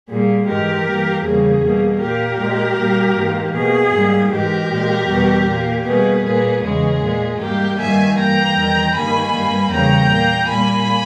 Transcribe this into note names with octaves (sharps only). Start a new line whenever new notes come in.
A#2 G3 A#3 G#4
G#2 E3 G#3 G4 A#4
G2 E3 A#3
E2 C#3 G3 A#3 G#4
B2 G3 A#3
A#2 A#3 G4 A#4
A#2 G#3
A#2 G3 A#3
G#2 E3 A#3
B2 A#3 G#4
G#2 G3 A#3
G#2 E3 G#3 G4 A#4
A#2 G#3
E2 B2 G3
A#2 A#3
B2 G3 A#3 G#4 B4
A#2 A#3 G#4 B4
E2 C#3 E3 G#3 G#4
A#2 G#3
G#2 G3 A#3 G4 A#4
G2 D#3 G3 A#3 E5 G#5
G2 E3 A#3 G5 A#5
E2 D#3 G3
G2 D#3 G3 A#3 G#5 B5
G2 G3 A#3
E2 C#3 G3 A#3 G5 A#5
A#2 A#3
A#2 G3 A#3 G#5 B5